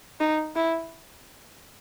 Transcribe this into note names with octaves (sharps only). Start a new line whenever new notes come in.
D#4
E4